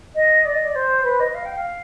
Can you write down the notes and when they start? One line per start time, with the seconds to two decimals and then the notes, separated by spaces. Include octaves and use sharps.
0.15 D#5
0.45 D5
0.54 D#5
0.65 D5
0.75 C5
1.04 B4
1.19 D#5
1.34 F5
1.45 G5
1.56 F5